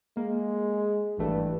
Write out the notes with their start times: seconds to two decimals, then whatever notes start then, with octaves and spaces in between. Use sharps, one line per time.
0.17 G#3 A#3
1.18 G#1 G2 E3 A3